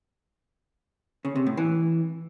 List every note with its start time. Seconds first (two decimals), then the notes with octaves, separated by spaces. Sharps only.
1.25 C#3
1.36 C3
1.46 A2
1.57 E3